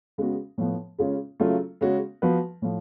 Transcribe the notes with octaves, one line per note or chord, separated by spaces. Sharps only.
C#3 G#3 B3 F#4
A2 F3 B3
C#3 G#3 C#4 F4
C#3 F#3 A3 F4
C#3 G#3 C#4 F#4
F3 B3 F#4 B4
A2 F3